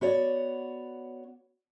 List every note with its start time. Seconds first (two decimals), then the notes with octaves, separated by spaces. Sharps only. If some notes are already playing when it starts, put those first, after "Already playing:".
0.01 B3 F#4 C#5 D5